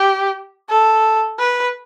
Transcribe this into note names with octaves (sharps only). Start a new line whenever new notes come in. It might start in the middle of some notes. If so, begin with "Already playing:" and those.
Already playing: G4
A4
B4